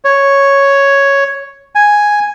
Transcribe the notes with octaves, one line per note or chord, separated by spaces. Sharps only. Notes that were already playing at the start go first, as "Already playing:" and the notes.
C#5
G#5